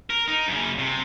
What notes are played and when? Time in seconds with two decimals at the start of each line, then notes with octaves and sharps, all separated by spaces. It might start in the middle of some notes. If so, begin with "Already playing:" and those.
0.10 A#4
0.28 D#4
0.48 F#2 C#3
0.79 C3